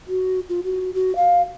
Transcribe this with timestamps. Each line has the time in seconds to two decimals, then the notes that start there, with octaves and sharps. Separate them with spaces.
0.07 F#4
0.48 F4
0.63 F#4
0.94 F#4
1.15 F5